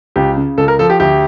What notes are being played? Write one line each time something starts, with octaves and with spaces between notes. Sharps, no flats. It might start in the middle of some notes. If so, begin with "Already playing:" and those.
C#2 G4
C#3
C#2 A4
A#4
F3 A4
G4
D2 G4